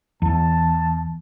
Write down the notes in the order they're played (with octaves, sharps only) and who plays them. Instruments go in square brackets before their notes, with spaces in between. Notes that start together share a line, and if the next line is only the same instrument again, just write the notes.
[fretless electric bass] E2 [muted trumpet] A5